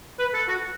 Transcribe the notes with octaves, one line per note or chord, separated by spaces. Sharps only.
B4
A4
F#4